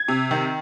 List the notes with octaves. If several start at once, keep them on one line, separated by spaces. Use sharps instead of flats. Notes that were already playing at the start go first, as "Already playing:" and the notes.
Already playing: G#6
C3
D#3